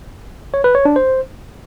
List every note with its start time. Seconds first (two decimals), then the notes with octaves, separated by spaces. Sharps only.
0.54 C#5
0.64 B4
0.75 C#5
0.85 D4
0.96 C5